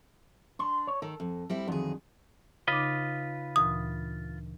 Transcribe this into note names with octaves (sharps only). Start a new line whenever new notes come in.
D4 C6
C#5
D#3 A4
F2
G3 C4 E4
F2 D3 D#3 F#3 G#4
C#3 D#4 F4 B4 D#5 D6
D2 A#2 E3 D#6